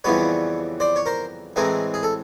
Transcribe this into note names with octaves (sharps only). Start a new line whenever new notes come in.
F2 C#3 E3 G3 B3 B4 C#5
C5 D5
C#5
A#4 C5
A2 E3 G#3 C4 G#4 A#4
G#4
A4